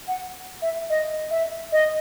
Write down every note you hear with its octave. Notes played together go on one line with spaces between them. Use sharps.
F#5
E5
D#5
E5
D#5